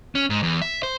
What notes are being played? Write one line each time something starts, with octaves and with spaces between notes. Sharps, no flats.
C#4
G#2
E2
E5
C5